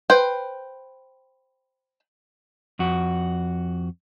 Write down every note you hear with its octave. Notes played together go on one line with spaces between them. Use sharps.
B4 C5 G5
F2 F#4